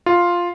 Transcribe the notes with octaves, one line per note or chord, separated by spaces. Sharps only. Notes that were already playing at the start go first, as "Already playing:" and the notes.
F4